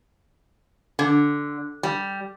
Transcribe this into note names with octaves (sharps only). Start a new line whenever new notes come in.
D3
G3